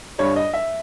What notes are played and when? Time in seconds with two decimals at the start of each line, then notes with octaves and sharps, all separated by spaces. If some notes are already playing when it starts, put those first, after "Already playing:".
0.18 G1 G2 G3 C#5
0.36 D#5
0.53 E5